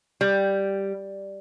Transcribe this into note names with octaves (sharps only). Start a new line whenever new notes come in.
G3